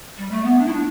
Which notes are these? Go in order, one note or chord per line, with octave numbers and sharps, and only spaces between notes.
G3
A3
B3
D4
E4
D4